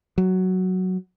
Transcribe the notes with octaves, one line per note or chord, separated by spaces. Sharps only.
F#3